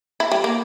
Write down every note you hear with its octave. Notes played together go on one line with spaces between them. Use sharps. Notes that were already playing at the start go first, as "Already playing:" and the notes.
E4
G3
A#3